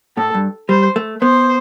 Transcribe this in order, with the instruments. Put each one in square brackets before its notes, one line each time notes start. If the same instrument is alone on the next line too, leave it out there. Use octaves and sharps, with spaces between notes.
[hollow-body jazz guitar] A2 [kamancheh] A4
[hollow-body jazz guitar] G2
[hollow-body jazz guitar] G3 [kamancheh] C5
[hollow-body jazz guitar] A3
[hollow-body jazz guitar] B3 [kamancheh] C5